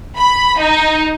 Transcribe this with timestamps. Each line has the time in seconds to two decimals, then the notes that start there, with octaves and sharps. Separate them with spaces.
0.17 B5
0.58 D#4